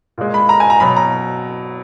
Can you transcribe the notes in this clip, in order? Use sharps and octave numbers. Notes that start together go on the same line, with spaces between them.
A#2 G#3
B5
A#5
G#5
A#5
B2 F#3 B5
A#5